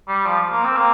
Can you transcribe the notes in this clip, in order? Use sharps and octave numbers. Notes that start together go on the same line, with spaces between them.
G3
F3
A#3
C4
A#3